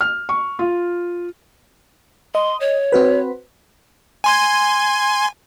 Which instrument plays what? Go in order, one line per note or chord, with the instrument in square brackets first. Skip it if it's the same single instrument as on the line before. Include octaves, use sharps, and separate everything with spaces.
[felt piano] F6
C#6
F4
[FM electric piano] D#5 [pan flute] C6
[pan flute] C#5
[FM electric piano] C4 F#4 B4
[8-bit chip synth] G#5 C6 G#6